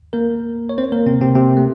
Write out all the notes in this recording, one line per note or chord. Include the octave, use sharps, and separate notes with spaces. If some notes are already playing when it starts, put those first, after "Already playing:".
A#3 A#4
C#5
C4 C5
A#3 A#4
C3 C4
C3 C4
C3 C4
A3